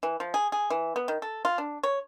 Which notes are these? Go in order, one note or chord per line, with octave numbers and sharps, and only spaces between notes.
E3
F3
G#4
G#4
E3
B3
D#3
A4
F4
D4
C#5